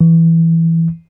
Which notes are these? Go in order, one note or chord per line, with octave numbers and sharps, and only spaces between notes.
E3